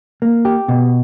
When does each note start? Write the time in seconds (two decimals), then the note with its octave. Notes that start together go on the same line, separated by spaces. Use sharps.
0.22 A#3
0.45 G4
0.68 B2